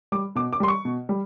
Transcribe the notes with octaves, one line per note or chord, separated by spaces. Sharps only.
G3 D6
B2 D6
D6
G3 C6
C#6
B2
G3